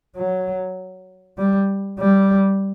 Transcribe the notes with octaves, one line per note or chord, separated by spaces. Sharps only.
F#3
G3
G3